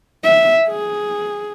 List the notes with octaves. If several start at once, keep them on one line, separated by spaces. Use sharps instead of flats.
E5
G#4